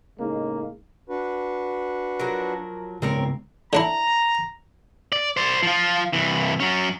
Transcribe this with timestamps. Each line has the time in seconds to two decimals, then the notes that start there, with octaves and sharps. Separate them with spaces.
0.19 A2 C#3 G#3 A#3 D#4
1.09 D4 F#4 B4
2.19 F3 F#3 A#4
3.02 C#3 G#3 B3 C4 A#4 C#5
3.73 D3 D4 E4 A#5
5.12 D5
5.37 C5 D5
5.63 F3 F4
6.13 C2 E3
6.60 F#3 C#4